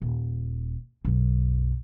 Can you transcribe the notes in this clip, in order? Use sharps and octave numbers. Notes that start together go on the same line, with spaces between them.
D#1
B1 F#2